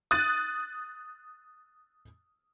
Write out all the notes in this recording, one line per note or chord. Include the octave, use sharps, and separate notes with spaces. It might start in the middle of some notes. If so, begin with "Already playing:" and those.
D#6 F#6 A6 D#7